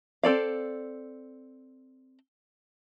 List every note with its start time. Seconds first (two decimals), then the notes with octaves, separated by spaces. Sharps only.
0.23 C4 A4 D5 F5